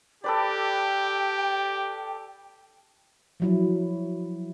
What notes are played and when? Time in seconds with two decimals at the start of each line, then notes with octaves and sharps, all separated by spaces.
0.24 G4 A4 B4 D5 G5
3.40 F3 F#3 E4